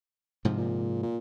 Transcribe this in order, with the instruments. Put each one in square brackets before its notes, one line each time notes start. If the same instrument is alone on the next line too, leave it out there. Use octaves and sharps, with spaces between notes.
[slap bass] G#2 C3 F3
[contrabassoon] A#2
A#2